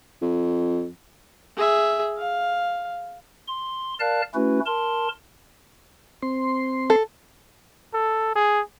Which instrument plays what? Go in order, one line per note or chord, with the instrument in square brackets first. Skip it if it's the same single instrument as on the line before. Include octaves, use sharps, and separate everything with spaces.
[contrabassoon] F2
[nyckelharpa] G#4 E5
F5
[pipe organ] C6
A#4 D5 F5 A5 F#6
A3 C#4 E4 F#4 B4
A#4 A5 C6
[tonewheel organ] C4 C6
[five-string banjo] A4
[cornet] A4
G#4